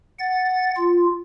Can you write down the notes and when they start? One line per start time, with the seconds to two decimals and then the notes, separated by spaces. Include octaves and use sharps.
0.19 F#5 A6
0.77 F4